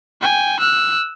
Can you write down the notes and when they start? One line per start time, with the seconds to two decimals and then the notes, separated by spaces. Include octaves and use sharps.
0.21 G5 G#5
0.60 E6 F#6